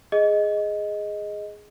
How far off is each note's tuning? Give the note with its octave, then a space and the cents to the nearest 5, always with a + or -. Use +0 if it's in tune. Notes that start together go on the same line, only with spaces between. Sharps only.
G#4 +0 D#5 +0